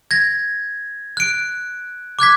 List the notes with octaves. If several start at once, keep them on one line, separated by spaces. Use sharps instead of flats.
G#6 A#6
F#6 D7
D6 F#6 G#6 B6